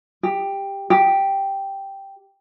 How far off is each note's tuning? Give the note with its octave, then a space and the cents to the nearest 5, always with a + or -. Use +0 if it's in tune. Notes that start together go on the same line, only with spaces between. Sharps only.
G4 +10
G4 +0